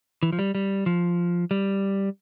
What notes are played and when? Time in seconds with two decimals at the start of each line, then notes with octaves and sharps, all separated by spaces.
0.23 E3
0.33 F3
0.39 G3
0.55 G3
0.86 F3
1.51 G3